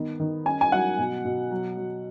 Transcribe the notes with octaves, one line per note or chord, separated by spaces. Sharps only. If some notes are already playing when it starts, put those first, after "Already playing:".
Already playing: D#3 B3
D#3
C#4 G#5
G#5
F#3 F#5
B2
B2
F#3
F#3